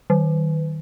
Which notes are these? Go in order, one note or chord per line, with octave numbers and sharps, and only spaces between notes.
D#3